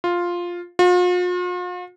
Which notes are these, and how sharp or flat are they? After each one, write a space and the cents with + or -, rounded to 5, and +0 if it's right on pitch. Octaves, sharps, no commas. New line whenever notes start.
F4 +5
F4 +45